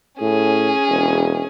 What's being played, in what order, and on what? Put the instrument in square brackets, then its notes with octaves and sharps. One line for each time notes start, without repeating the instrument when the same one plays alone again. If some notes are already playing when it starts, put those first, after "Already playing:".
[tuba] A2 [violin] C#4 G#4
[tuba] E1